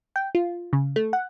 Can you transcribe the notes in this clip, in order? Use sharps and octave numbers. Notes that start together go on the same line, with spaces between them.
G5
F4
C#3
A3
F#5